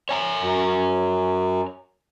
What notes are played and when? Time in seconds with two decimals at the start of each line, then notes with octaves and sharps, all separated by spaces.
0.09 C#5 G#5 A#5
0.40 F#2